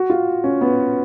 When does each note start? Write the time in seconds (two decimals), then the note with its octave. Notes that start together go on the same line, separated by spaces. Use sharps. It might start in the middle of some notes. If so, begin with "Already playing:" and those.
Already playing: F#4
0.10 F4
0.44 C#4
0.61 B3